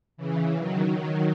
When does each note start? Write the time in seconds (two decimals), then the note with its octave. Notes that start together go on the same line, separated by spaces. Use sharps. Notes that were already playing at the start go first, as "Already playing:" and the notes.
0.17 C#3 E3
0.57 D#3 F#3
0.98 D#3 F#3